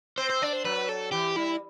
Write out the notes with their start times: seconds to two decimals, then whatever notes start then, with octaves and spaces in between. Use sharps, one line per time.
0.18 C4 C5
0.30 C5
0.42 D4 D5
0.53 C5
0.64 F#3 B4
0.89 A4
1.12 E3 G4
1.36 G3 E4